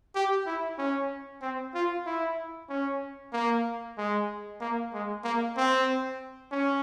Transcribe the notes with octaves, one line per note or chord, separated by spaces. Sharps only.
G4
E4
C#4
C4
F4
E4
C#4
A#3
G#3
A#3
G#3
A#3
C4
C#4